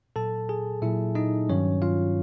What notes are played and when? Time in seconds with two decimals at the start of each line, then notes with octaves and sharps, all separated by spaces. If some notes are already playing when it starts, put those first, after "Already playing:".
0.16 A#2 F#3 A4 A5
0.49 G#4 G#5
0.82 A#2 F#3 E4 E5
1.15 D#4 D#5
1.49 G2 D#3 F#3 C#4 C#5
1.82 F4 F5